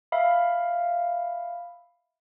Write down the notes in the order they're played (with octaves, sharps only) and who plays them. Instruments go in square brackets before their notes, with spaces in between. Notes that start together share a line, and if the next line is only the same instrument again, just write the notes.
[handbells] E5 F5 B5